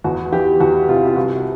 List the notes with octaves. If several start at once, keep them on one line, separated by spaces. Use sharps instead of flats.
E2 F#4
E3 G4
E2 F#4
C3 F4
F4
C2 F#4